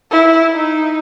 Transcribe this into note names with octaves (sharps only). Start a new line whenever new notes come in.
E4
D#4